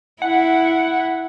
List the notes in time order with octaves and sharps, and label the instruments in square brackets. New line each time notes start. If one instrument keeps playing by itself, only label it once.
[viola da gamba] E4 [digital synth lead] F#5